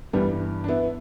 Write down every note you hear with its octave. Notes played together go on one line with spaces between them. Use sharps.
G2 E3 G3 B3
D4
B3 E4